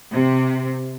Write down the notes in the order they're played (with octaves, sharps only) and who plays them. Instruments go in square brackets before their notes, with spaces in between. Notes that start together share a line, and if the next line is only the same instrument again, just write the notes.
[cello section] C3